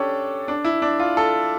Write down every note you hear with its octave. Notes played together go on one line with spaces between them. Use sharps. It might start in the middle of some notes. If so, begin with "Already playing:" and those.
Already playing: C#4 D4 G4 A4
D4
E4
D4
F4
A4